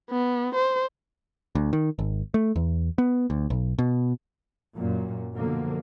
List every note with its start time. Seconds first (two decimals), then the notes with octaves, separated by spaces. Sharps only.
0.11 B3
0.55 C5
1.55 D2
1.73 D#3
1.99 G#1
2.34 A3
2.56 E2
2.98 B3
3.30 D2
3.50 B1
3.79 B2
4.76 F#2 A#2
5.35 B2 D3 F3 A#3